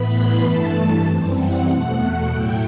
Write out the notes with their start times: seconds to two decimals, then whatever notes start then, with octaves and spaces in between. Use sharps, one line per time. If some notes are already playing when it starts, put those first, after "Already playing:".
Already playing: A2 E3 B3 B5
0.09 C6
0.40 G2 E3 A3 A5
1.03 F#2 E3 G3 C4
1.34 F#5
1.65 E2 B2 A3
2.27 A2 F#3 A3 E4 G5